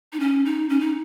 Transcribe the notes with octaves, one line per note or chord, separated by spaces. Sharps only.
D#4
C#4
D#4
C#4
D#4